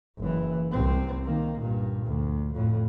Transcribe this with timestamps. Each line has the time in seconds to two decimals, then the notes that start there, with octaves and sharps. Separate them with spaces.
0.19 F#1 E3
0.72 C2 C4
1.25 D#3 A#3
1.59 G2 A#2
2.06 D2
2.53 F2 A2